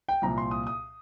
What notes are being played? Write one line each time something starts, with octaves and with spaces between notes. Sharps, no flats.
G5
C2 A#2 F3 A#5
C6
D#6
D#6